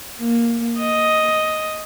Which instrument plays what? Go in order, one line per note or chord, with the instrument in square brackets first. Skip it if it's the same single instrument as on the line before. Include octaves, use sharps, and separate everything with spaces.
[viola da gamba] A#3
D#5